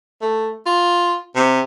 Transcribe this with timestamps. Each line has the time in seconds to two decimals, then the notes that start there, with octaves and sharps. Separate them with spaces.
0.21 A3
0.66 F4
1.35 C3